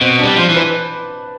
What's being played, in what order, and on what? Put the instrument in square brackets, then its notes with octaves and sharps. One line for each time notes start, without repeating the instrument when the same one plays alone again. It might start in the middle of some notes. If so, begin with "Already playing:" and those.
[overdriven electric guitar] B2 [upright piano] C4
[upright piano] D4
[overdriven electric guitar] G3
[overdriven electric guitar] F3 [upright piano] C5
[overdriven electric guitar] E3
[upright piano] B4